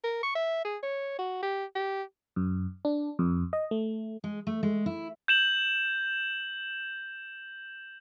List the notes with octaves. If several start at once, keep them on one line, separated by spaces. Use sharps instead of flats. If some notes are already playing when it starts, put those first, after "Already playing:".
A#4
C#6
E5
G#4
C#5
F#4
G4
G4
F#2
D4
F2
D#5
A3
G#3
A3
G#3
E4
G6 E7 F#7